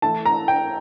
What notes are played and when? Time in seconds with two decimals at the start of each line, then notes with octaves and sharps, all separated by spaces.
0.02 E3 A3 E4 A5
0.26 A#5
0.48 G5